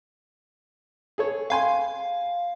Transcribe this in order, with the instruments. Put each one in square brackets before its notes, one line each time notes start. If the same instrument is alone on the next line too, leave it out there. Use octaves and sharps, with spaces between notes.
[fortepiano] G#4 A4 C#5
[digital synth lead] F5 [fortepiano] G5 G#5 C6